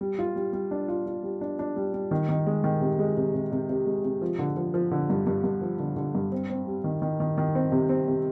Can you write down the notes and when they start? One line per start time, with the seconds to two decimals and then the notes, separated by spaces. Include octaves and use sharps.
0.01 G3
0.19 F4
0.36 G3
0.53 G3
0.71 D4
0.88 F4
1.06 F4
1.23 G3
1.41 D4
1.59 D4
1.76 G3
1.94 G3
2.11 D#3
2.29 D#3
2.47 G#3
2.64 D#3
2.81 C3
2.99 G#3
3.17 C3
3.34 C3
3.52 C3
3.69 C3
3.86 G#3
4.04 C3
4.22 F3
4.39 D3
4.57 F3
4.74 F3
4.91 D3
5.10 G2
5.27 G2
5.44 G2
5.61 F3
5.80 D3
5.96 D3
6.15 G2
6.32 C4
6.50 C4
6.67 G3
6.84 D#3
7.02 D#3
7.20 D#3
7.38 D#3
7.55 C4
7.72 C3
7.89 C4
8.08 C3